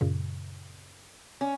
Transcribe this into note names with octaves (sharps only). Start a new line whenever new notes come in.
F#2 A#2 C#3
C#4